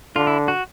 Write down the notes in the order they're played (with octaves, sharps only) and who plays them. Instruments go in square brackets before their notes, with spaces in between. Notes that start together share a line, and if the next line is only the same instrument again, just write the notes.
[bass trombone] D3 [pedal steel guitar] F4
[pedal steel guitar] E4
F#4